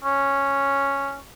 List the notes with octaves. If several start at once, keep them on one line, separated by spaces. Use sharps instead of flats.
C#4